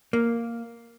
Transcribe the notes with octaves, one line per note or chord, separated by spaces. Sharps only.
A#3